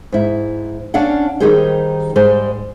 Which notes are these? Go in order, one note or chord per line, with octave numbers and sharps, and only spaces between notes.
G#2 E4
C#4 D4 D5 F5 F#5
D#3 G3 D#4 G4 G#4 C5
G#2 G3 G#3 C5